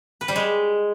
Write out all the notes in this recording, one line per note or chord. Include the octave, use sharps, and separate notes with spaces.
B4
G3
G#3